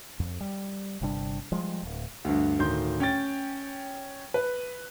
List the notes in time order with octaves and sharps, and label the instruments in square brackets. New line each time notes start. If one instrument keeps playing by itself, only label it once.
[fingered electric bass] F2
G3
G1 C3 G3 D4
F3 G3 G#3
D1
[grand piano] D2 G2
D1 D#3 C6 G6
C#4 G5 A6
B4